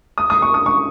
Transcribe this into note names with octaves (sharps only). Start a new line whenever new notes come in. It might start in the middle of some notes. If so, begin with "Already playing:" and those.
D#6
D#6
C#6
D#6
C#6